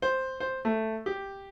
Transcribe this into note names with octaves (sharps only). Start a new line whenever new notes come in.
C5
C5
A3
G4